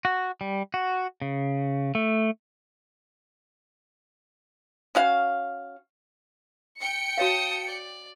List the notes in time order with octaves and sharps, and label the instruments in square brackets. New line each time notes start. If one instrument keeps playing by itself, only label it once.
[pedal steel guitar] F#4
G3
F#4
C#3
A3
[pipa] C#4 F#4 F5
[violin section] G5 C#7
[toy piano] F#4 C#5 F5 [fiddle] A5 D#6
[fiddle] D5